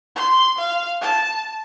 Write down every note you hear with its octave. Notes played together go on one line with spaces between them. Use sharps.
C6
F5
A5